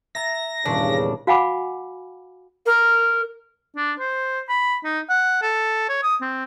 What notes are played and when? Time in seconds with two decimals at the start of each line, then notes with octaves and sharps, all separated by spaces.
0.15 E5 A#5 A6 A#6
0.65 D#1 E2 G2 A#2 C#3 D4 C#6
1.27 F#4 F5 F#5 G#5 B5 D6
2.66 A#4
3.76 D4
4.00 C5
4.49 B5
4.84 D#4
5.10 F#5
5.42 A4
5.89 C#5
6.03 D#6
6.22 C4